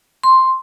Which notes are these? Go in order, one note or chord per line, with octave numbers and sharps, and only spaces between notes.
C6